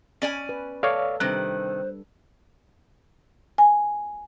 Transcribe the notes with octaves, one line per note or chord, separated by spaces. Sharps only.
C#4 D5 G#5
B4
A4 C#5 D5 F5
C3 D#3 G3 D4 B4 C5 F#6
G#5